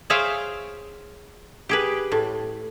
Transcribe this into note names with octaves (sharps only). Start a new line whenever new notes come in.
G#4 C5 C#5 E5 F5 G5
G4 G#4 B4
A2